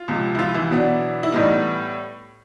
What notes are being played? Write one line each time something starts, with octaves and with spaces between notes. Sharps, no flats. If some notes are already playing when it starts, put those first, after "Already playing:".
Already playing: F4
C#2 C3 F3
E4
F3 F4
E3 E4
B2 F#3 B3 D4
E4
A2 E3 G3 B3 D4 D#4